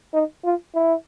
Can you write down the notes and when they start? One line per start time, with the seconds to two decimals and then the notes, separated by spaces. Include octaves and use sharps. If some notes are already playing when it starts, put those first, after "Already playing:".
0.14 D#4
0.44 F4
0.75 E4